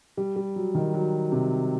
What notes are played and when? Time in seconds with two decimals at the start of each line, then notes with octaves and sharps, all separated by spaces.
0.17 G3
0.36 G3
0.56 F#3
0.75 D#3
0.94 F#3
1.32 C3